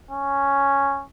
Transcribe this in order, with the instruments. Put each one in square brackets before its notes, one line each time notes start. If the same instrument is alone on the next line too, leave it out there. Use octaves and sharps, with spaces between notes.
[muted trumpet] C#4